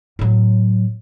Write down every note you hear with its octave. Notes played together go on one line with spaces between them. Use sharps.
A2 F#3